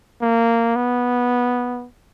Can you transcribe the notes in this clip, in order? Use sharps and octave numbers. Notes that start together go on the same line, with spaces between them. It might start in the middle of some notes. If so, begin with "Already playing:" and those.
A#3
B3